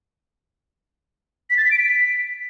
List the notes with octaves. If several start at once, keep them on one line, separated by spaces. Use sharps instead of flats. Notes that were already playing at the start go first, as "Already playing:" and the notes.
B6
A6
B6
D7
B6